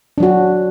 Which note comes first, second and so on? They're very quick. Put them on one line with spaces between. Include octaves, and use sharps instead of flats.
D4 F#3 F#4